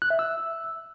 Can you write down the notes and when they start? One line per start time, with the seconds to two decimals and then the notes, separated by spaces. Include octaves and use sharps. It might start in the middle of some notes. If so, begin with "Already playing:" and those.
0.02 F#6
0.10 E5
0.19 E6